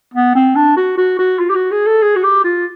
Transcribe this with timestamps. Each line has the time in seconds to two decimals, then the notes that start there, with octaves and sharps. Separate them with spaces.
0.14 B3
0.36 C4
0.56 D4
0.77 F#4
0.98 F#4
1.19 F#4
1.39 F4
1.50 G4
1.55 F#4
1.71 G#4
1.86 A4
2.02 G#4
2.16 F#4
2.24 G4
2.44 F4